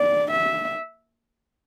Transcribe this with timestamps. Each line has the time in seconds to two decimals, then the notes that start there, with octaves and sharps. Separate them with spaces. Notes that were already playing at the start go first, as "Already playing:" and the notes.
Already playing: D5
0.32 E5